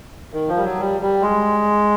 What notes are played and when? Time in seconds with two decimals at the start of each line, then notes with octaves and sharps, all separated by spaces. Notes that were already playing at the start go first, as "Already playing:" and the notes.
0.34 D#3
0.49 F3
0.57 G3
0.64 F#3
0.80 G3
1.01 G3
1.22 G#3